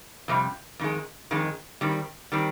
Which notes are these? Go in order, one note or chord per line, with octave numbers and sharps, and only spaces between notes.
F2 C3 G3
F2 D#3 G#3
F2 D#3 G#3
D#3 G3 C4
D#3 G3 C4